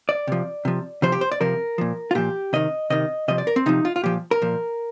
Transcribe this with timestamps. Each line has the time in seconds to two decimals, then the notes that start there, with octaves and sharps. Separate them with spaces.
0.09 D5
0.27 C3 F3
0.65 C3 F3
1.02 C3 F3 C5
1.12 G4
1.21 C5
1.32 D5
1.41 C3 F3 A#4
1.78 A#2 F3
2.11 F4
2.15 A#2 F3 G4
2.53 C3 D#3 D#5
2.90 C3 D#3 D#5
3.28 C3 F3 D#5
3.38 D5
3.47 A#4
3.56 C4
3.66 C3 F3 D#4
3.85 F4
3.96 F4
4.04 A#2 F3 G4
4.31 A#4
4.42 A#2 F3